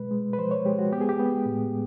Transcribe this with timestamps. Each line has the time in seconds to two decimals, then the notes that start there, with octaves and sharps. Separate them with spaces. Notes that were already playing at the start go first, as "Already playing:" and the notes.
Already playing: B2 G#3 B4
0.11 G#3
0.33 B4
0.38 F3 C5
0.51 C#5
0.65 G#3 G4
0.79 F#4
0.92 B3 G4
1.01 G#4
1.09 G4
1.19 B3
1.46 A2